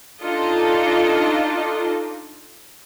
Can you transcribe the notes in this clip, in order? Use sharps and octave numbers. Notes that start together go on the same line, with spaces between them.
D4 D#4 F4 A4 D#5